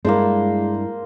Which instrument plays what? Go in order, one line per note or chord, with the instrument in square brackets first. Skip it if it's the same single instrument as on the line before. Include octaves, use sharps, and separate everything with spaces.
[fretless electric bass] G2 [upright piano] G#3 [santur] A#3 C5 [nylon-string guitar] D4 E4